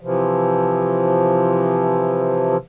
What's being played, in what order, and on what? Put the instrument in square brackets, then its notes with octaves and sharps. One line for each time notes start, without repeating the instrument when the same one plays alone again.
[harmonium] C3 E3 F3